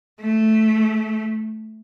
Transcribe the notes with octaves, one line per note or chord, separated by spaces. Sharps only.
A3